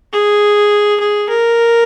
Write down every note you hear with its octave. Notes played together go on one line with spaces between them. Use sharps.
G#4
G#4
A#4